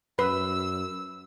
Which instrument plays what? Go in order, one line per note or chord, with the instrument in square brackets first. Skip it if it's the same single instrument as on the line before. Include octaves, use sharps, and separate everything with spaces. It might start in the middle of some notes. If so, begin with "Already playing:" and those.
[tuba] F#2 [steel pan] B4 [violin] E6